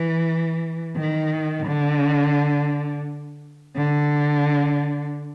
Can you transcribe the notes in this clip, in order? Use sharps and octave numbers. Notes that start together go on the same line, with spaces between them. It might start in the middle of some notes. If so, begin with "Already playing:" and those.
Already playing: E3
D#3
D3
D3